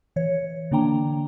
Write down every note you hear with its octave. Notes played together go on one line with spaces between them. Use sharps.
E3 C#5
D3 A#3 D4 G5 A#5